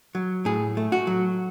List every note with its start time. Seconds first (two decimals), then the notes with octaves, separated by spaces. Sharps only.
0.15 F#3
0.45 A2 G#4
0.77 A3
0.92 F#4
1.07 F#3